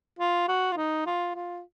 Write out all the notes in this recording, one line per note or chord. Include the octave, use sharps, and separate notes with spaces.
F4
F#4
F4
D#4
F4
F4